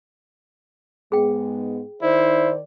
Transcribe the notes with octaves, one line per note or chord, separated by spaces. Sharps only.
G#2 G#3 B3 G#4 G5
D#3 D#4 E4 C5 D5